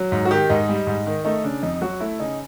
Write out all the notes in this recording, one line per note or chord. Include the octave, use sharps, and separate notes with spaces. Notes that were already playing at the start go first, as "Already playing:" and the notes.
Already playing: F#3
G#2
F#4
D#3 G4
G#2 D#4
G3
G#2
D#3
A3 D#4
C#3 D4
F2 D#4
F#3 F#4
A3 E4
C#3 D#4